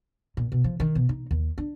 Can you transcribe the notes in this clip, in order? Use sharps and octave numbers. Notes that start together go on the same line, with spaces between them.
A#2
B2
F3
D#3
B2
D#4
D#2
D4